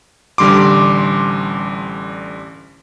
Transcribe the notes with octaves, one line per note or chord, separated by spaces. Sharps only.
A1 D3 G3 C6 D6